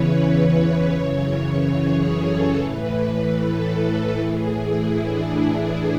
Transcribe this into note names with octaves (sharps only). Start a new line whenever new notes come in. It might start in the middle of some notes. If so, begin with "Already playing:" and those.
Already playing: E2 C#3 E3 B4 C#5
C#5
B4
F#2 C#3 E3 C#5
G#4
A4
A2 E3 B4
A4
A4
A2 E3 G#4
E4
D4